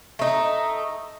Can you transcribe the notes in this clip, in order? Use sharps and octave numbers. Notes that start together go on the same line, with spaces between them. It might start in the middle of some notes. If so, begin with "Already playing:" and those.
A3 D#4